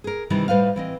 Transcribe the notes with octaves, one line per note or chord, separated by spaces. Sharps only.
G#4 A#4
C3 D#3 E3 G3 D4
A2 G3 B4 C5 F5
E3 C4 D#5